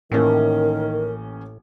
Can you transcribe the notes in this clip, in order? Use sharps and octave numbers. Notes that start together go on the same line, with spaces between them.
A1 A2 D#3 A#3 C#4 A#4